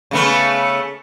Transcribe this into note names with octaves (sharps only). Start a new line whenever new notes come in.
C#3 A3 B3